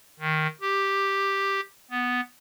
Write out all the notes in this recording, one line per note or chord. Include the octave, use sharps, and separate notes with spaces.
D#3
G4
B3